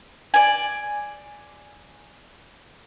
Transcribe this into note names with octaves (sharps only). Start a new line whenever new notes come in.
D5 G#5